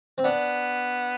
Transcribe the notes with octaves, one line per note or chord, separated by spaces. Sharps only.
C4
B3 D4